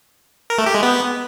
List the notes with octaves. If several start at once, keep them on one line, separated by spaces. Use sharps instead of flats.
A#4
A3
G4
G#3
B3